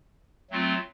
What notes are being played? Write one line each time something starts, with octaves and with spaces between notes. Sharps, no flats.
F#3 A3 C4 F4